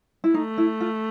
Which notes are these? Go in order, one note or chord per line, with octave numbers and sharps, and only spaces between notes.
E4
A3 D#4
E4
F4